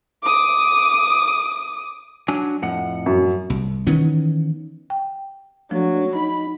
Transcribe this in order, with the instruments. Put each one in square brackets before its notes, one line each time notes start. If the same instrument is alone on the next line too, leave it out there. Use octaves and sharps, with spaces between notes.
[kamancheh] D6 D#6
[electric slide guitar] F#3 D4 G#5
F2 A2 F#5
[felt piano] F#2
[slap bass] C2
D#3 E3 B3 C#4
[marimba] G5
[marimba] F3 [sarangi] F#3 [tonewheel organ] A3 D4
[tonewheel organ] D#4 [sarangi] B5